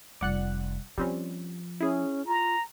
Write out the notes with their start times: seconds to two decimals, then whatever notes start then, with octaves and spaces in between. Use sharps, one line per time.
0.21 F1 G3 D5 F#5 F#6
0.98 F3 G3 C4 C#4
1.80 C#4 E4 G#4
2.26 F4 A#5